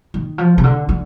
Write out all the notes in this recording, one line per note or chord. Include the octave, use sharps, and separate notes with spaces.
D#3
F3
C3
D3
D3